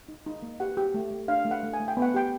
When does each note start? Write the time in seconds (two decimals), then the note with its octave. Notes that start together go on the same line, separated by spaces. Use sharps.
0.08 D#4
0.26 D#4
0.43 A#3
0.60 G4 F#5
0.77 G4
0.94 A3
1.11 A3
1.28 D4 F5
1.45 A3
1.51 F#5
1.63 A3
1.73 G#5
1.80 A3
1.88 G5
1.97 B3
2.02 F#5
2.14 G4 G5